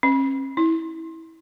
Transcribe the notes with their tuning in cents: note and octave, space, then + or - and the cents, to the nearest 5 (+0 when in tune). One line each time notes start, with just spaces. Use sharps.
C#4 -45
E4 -20